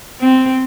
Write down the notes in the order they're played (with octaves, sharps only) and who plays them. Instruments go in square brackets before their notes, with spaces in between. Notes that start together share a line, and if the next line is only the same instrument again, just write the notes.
[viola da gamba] C4